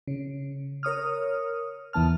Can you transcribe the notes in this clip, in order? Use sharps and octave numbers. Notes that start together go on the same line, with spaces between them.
C#3
A#4 C#5 D#6 F6
E2 E3 B3 A5 F6